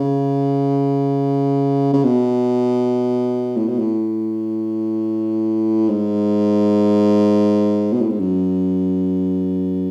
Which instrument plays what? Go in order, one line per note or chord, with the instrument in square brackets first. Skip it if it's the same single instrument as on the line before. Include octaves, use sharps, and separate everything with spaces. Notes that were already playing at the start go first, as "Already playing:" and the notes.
Already playing: [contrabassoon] C#3
C#3
B2
A2
B2
A2
G#2
B2
A2
G#2
F#2